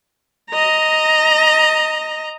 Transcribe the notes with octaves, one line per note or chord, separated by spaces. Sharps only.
D#5 A#5